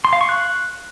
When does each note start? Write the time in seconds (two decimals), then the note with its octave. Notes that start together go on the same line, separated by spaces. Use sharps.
0.05 C6
0.13 F5
0.21 C#6
0.29 F#6